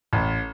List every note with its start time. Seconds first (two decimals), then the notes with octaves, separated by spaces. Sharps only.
0.13 A1